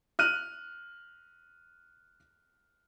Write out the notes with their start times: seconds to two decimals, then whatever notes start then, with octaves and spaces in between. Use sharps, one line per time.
0.19 F6 F#6 D#7